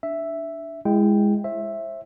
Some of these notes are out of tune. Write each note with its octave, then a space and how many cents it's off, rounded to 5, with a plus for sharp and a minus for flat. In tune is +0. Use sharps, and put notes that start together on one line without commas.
D4 +0 E5 +0
G#3 -10 E4 +20 G5 +0
C5 +40 E5 +0